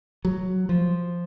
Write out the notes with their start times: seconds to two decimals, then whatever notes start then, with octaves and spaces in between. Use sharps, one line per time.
0.25 F#3
0.69 F3